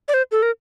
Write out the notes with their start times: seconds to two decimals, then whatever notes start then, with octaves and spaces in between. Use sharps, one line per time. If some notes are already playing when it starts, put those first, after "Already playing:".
0.08 D5
0.14 C5
0.32 A4
0.42 A#4